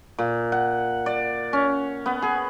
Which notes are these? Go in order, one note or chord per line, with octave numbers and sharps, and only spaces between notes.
A#2
F#5
D5
C#4
B3
G#4